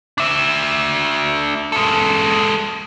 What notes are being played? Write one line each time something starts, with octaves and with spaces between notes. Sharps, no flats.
D4 E5
G#3 A4